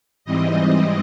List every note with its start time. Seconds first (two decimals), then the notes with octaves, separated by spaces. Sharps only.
0.25 G#2 E3 G3 C4 D#5